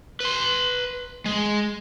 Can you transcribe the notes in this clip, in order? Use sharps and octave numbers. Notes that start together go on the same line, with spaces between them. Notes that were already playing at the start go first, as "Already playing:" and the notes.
B4 C6
G#3